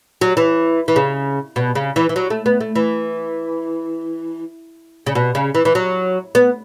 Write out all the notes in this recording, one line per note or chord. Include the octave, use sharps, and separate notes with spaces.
F#3
E3
E3
C#3
B2
C#3
E3
E3
F#3
A3
B3
A3
E3
C#3
B2
C#3
E3
E3
F#3
B3